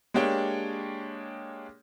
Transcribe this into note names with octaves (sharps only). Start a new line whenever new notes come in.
G#3 A#3 D4 G4 C#5 G5